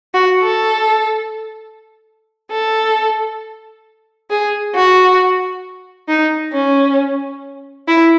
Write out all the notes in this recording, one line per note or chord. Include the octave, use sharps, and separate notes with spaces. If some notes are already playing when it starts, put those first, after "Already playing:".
F#4
A4
A4
G#4
F#4
D#4
C#4
E4